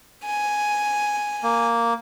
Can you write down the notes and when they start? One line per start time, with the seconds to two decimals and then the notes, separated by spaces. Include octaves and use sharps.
0.25 G#5
1.43 A#3